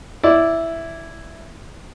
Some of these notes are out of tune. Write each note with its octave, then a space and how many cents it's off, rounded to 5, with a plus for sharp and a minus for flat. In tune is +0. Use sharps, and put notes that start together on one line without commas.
E4 +0 D5 -10